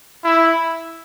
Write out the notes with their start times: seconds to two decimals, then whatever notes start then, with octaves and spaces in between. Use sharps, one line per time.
0.24 E4